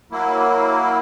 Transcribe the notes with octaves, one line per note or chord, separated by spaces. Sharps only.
F#3 A#3 E4